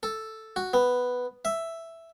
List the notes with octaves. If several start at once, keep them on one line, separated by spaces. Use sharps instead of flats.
A4
F#4
B3
E5